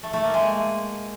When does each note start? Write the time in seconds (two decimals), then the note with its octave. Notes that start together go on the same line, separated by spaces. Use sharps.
0.03 A3
0.13 A3
0.24 A#3
0.34 G#3